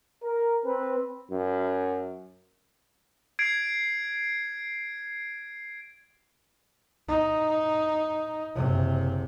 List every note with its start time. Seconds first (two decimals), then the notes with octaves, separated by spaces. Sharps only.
0.24 A#4
0.64 C4 B4
1.31 F#2
3.39 G#6 C7 D7
7.08 D#4
8.56 F#1 C3